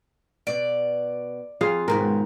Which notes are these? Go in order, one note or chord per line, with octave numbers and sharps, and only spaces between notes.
B2 D5
F2 F4 G#4 F5
D#2 G#2 B2 A#4